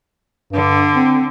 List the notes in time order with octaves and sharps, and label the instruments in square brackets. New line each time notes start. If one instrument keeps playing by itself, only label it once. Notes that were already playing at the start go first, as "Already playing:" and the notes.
[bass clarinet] G2 [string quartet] D3
[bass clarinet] C4